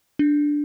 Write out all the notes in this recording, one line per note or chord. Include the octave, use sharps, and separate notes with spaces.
D4